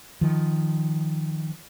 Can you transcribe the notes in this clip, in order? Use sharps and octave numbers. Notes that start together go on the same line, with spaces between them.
D#3 F3